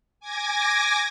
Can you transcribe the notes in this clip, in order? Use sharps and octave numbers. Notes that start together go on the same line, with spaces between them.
G#5 D6 G#6 A#6